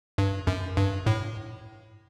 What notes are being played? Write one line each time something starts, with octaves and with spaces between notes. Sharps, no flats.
G2
F#2
G2
A2